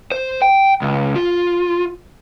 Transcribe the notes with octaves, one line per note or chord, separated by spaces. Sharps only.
C5
G5
C#2
F4